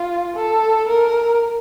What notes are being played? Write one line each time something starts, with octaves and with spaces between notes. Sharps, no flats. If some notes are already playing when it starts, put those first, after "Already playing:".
Already playing: F4
A4
A#4